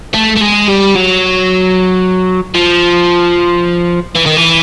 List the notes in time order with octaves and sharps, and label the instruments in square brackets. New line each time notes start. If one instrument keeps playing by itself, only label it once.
[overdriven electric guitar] A3
A3
G#3
G3
F#3
F3
E3
D#3
E3